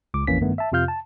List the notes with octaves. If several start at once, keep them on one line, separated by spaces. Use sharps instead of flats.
C#2 D6
A#1 F2 E3 A#3 C#4 B6
G2 D#3 A3 B3
E5 A5
F2 C3 F4 F5 F6 G6
A5